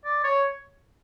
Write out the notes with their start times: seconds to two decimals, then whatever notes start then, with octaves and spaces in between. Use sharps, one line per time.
0.05 D5
0.24 C#5